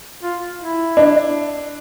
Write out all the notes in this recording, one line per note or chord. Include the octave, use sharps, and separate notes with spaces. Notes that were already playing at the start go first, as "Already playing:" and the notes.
F4
E4
D4